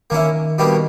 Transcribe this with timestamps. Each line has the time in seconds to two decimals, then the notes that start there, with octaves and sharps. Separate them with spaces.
0.10 D#3 A#3 C#4 E4
0.58 B2 G3 A#3 D4